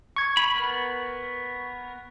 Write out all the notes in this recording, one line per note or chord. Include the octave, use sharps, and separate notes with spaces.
C#6 G#6
B5
B3 A#4